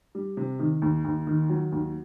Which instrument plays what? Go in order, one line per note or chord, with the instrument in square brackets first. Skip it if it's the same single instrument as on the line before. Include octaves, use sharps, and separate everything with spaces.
[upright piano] G3
C3
D#3
D#2
D#2
D#3
F#3
D#2